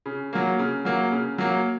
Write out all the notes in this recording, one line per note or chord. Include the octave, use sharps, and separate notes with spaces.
C#3
F#3 A#3
C#3
F#3 A#3
C#3
F#3 A#3